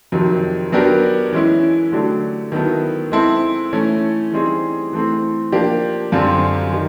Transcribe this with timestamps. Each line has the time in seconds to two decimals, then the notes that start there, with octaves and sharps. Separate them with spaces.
0.12 F2 C3 D#3 F#3
0.72 F#3 B3 D4 G4 A#4
1.33 E3 G#3 C#4 E4
1.92 D3 F#3 A3 D4 G4
2.52 D#3 F#3 B3 E4 A4
3.12 G#3 C4 E4 A4
3.73 E3 A3 C#4
4.32 E3 G3 C4 D#4 G#4
4.93 E3 A3 C4
5.52 F3 A#3 D4 G4
6.12 F#2 D3 G3 C4 F4
6.72 D#3 G3 D#4